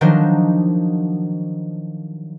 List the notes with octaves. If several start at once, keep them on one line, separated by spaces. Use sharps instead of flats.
D#3 F3 F#3 D4 D#4 C5